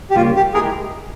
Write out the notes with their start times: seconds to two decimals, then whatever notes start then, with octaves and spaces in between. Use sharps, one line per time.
0.10 G4
0.16 C#3 G3 A#3 F4
0.36 G4
0.54 G#3 E4 G4 G#4 A#4